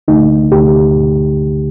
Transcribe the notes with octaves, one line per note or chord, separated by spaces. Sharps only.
D2 D3 A3 D#4
D2 D3 A3 G4